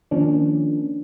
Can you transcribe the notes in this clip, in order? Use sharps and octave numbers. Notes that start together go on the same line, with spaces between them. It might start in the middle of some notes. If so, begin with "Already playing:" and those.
D#3 F3 A#3 C#4 D4